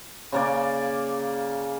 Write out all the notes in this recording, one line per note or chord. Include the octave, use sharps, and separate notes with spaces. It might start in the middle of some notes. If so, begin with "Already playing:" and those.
C#3 A#3 D5